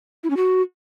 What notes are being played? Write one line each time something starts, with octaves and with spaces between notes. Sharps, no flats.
E4
C#4
F#4